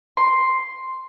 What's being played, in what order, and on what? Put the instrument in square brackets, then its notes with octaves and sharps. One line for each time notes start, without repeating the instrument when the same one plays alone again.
[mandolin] C6